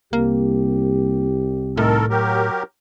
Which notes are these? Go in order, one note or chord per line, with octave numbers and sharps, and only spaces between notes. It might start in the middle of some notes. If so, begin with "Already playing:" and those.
C2 A#3 G4
A2 D#3 A4 A#4
F#3 G4 A#4